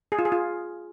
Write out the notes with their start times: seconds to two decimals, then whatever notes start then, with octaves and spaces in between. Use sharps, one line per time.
0.12 G#4
0.19 F4
0.25 G#4
0.32 F4